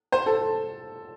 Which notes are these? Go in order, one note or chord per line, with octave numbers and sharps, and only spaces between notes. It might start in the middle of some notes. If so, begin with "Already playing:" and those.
C5
A4